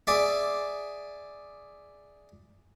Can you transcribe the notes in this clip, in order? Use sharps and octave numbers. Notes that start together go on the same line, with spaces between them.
G#4 D5 E5